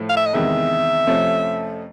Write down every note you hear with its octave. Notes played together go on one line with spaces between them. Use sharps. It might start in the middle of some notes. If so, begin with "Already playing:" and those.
Already playing: A2 F3 A3
F5
E5
D#5
E2 C3 D#3 G#3 B3 E5
F2 C3 F3 A3 C#4